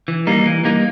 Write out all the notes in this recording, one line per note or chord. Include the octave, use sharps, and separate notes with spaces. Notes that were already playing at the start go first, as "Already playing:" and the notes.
E3
G3 A#3 D#4
E3
G3 A#3 D#4